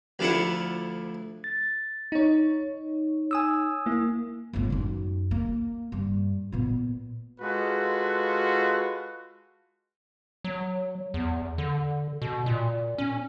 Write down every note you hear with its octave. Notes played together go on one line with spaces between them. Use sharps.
D2 F3 A3 D4 E4 F#5
A6
D#4 C#5
G#5 D#6 E6
A#3 E4
G1 A2
F#2 D#4
A#3
G2
A#2 B3
G#3 F4 F#4 A4 B4
F#3
E2
D3
B2
A#2
C#4